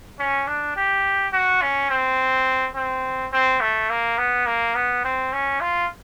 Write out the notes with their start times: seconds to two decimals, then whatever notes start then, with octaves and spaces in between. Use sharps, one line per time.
0.19 C#4
0.47 D4
0.77 G4
1.33 F#4
1.62 C#4
1.90 C4
2.75 C4
3.33 C4
3.61 A3
3.90 A#3
4.18 B3
4.47 A#3
4.75 B3
5.04 C4
5.33 C#4
5.61 F4